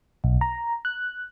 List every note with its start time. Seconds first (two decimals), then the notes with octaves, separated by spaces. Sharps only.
0.24 B1
0.41 A#5
0.85 F#6